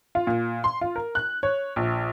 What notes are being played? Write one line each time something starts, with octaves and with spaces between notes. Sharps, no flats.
F4
A#2
C6
F4
A#4
F#6
C#5
A#1